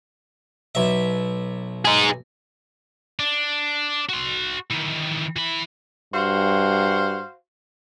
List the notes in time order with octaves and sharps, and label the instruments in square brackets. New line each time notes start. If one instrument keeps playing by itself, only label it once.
[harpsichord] B1 E5
[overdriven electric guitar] D#4 G#4
[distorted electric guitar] D4
F#4 C6
D#3 E3
E3 B5
[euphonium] G2 [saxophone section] F#4 C5 F5